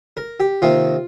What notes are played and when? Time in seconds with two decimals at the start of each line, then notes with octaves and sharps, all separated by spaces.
0.17 A#4
0.40 G4
0.62 C3 D#3 A#3 F4